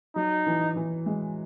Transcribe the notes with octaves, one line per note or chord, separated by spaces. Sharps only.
F#3 D#4
E3
E3
G#3